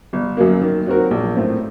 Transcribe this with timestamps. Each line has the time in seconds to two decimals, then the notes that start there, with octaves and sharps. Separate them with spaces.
0.13 G1
0.37 F#2 F#3 A#3
0.61 D#3
0.86 F#3 C4 F#4 A#4
1.11 A#1
1.36 A2 A3 C4